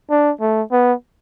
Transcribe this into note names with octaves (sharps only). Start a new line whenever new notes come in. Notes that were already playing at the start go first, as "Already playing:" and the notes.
D4
A3
B3